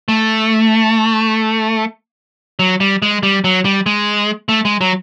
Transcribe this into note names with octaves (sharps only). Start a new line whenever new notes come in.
A3
F#3
G3
G#3
G3
F#3
G3
G#3
A3
G#3
F#3